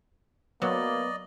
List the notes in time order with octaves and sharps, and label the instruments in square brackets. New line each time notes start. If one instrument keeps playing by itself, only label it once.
[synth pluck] F#3 [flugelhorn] A#3 [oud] B3 [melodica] D5 D#5